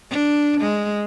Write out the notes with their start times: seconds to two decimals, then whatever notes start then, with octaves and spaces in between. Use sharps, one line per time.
0.10 D4
0.61 G#3